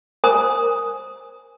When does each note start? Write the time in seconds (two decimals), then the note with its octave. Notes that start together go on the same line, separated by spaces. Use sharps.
0.24 A#4 C5 G#5 D#6